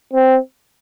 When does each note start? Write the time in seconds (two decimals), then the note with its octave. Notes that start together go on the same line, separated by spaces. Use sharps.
0.13 C4